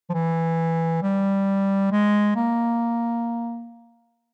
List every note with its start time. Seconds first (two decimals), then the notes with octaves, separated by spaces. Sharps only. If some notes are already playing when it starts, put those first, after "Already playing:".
0.10 F3
0.14 E3
1.02 G3
1.92 G#3
2.36 A#3